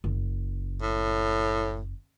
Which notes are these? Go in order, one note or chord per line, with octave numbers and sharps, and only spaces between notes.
F#1
A2